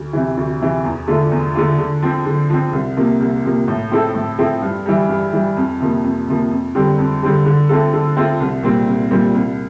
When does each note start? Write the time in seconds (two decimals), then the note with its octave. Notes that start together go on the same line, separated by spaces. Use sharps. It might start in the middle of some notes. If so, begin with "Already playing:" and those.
Already playing: D2
0.13 C3 E3
0.37 D2
0.60 C3 E3
0.84 E2
1.08 D3 A3 D4 F4
1.31 E2
1.55 D3 A3 D4 F4
1.79 D3
2.02 F3 C4
2.26 D3
2.50 F3 C4
2.73 C2
2.97 C3 F3 A#3
3.20 C2
3.44 C3 F3 A#3
3.68 A2
3.91 F3 C4 E4 A4
4.15 A2
4.39 F3 C4 E4 A4
4.62 G2
4.86 E3 G3
5.09 G2
5.33 E3 G3
5.57 F2
5.80 C3 F3 A#3
6.04 F2
6.28 C3 F3 A#3
6.51 F2
6.75 D3 G3 C4 G4
6.98 F2
7.22 D3 G3 C4 G4
7.46 D3
7.69 A3 C4 F4 A4
7.93 D3
8.16 A3 C4 F4 A4
8.40 C2
8.63 A#2 G3 C4
8.87 C2
9.11 A#2 G3 C4
9.35 C2